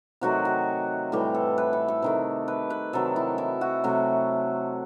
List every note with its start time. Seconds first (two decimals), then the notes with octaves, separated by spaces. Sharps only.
0.21 C3 D#3 F#3 A3 F#4
0.45 F#4
1.12 A2 E3 G3 G4
1.34 A4
1.58 B4
1.73 A4
1.88 A4
2.02 C3 D#3 A3
2.48 B4
2.70 B4
2.93 C3 D#3 F#3 A4
3.16 E4
3.38 E4
3.61 F#4
3.84 C3 F#3 A3